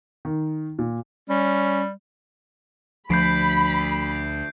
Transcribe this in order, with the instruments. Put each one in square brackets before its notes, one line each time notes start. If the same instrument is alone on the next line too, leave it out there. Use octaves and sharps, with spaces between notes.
[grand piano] D#3
A#2
[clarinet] G3 [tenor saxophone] C#4
[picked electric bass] D2 [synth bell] F3 [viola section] B5 [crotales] G6 C7 D7